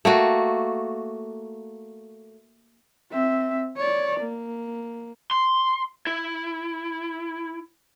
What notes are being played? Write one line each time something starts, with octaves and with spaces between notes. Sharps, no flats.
A3 A#3 F#4
C4 E5
C#5 D5
A#3
C6
E4